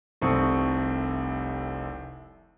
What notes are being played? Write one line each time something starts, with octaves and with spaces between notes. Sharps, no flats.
F1 C2 C4 A4 C#6 D#6